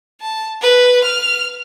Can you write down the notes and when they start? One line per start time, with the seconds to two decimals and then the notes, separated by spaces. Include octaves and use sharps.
0.21 A5
0.61 B4
1.03 F6